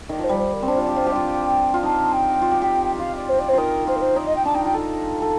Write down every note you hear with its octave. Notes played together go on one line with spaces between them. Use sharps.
D#3 D5
F3 C5
G3
C5
A#4
C4
D4 C5
F4 D5
G4
F4 C5
G4
F4 G5
F4
D#4 A5
G5
F4
G4
G4
F4 F5
D5
C5
D5
C5
D#4 F4 A#4
F4 C5
A#4
C5
D#4 D5
D#5
G5
D4 A5
D#4 G5
F4 G5
A4
A4